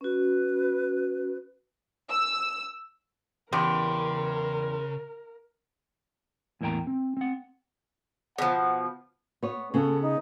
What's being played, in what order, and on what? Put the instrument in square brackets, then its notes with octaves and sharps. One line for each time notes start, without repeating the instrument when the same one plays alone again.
[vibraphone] C#4 F#4 [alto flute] B4
[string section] E6
[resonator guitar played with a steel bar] E2 G4 [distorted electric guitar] C#3 [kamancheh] A#4 [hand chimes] B5 C6
[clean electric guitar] E2 A2 A#3 C5 G5 A#5
C4
C4 F#5
[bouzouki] B2 F3 [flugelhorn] F#5
[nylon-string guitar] B3 C#5
[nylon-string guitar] C#3 B3 [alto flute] A4
[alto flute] D#4